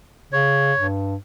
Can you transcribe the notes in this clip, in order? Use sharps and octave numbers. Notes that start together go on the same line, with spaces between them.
C#3 C#5
G2